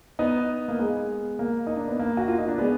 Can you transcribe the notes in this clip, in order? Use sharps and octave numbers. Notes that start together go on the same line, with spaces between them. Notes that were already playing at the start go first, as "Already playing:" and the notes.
B3 D#4
A#3
G#3 B3
A#3
D#4
D4
B3
A#3
F#4
F4
D#4
D4
G#3 B3